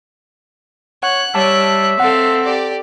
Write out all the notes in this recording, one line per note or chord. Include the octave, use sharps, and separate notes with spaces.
C#5 F#5 F#6
G3 C#5 E5 A5 D6 E6 F#6
C4 A4 F5 F#5
G4 D5